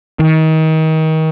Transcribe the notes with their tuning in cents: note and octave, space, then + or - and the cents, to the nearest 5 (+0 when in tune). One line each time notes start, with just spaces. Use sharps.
D#3 +30